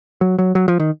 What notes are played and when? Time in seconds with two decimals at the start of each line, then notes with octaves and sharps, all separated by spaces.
0.21 F#3
0.39 F#3
0.55 F#3
0.68 F3
0.80 D#3